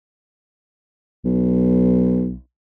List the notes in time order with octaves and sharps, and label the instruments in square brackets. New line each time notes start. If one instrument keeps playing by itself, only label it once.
[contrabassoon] B1